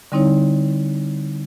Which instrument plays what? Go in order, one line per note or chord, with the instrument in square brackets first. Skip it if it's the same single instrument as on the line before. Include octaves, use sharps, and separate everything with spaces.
[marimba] D3 G3 C4 D#4 E4 C#5